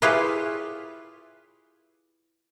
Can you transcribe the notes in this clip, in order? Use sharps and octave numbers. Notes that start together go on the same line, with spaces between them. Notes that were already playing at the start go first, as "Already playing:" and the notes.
E4 F4 G4 G#4 B4 C#5